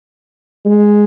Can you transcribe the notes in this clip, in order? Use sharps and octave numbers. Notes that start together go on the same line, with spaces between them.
G#3